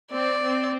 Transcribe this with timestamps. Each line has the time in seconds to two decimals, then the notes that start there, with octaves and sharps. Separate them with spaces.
0.12 C4 D5
0.43 C4